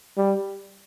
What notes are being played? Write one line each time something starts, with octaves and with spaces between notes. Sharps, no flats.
G3